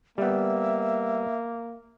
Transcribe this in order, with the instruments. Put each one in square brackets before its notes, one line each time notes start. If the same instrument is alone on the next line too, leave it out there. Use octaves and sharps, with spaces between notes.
[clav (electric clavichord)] G3 B3 [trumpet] A#3 [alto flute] E5